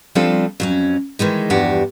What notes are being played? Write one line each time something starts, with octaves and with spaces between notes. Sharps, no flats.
F3 G3 C4 D4 F4 A4
F2 F#3 C#4
D#3 E3 G#3 D#4
E2 G2 F3 D4 F#4 G4